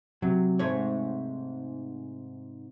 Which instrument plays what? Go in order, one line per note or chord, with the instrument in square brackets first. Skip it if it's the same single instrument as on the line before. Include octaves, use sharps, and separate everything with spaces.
[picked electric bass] C3 [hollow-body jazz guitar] F#3
[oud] G#2 A3 [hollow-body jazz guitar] C#5